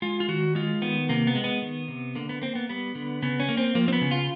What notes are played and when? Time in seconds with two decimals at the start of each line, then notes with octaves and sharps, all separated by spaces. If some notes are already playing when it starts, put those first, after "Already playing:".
0.02 G#3 F4
0.20 F4
0.28 D#3 F#4
0.55 G#3 F4
0.82 D#3 B3
1.09 C3 A#3
1.27 B3
1.35 G#3
1.44 B3
1.62 D#3
1.88 C3
2.15 D3 A#3
2.29 B3
2.42 A#3 C4
2.55 B3
2.69 G3 B3
2.95 D3
3.22 C#3 B3
3.40 C#4
3.49 A#3
3.57 C4
3.75 F3 A#3
3.88 C4
3.93 B3
4.01 C#3
4.11 F4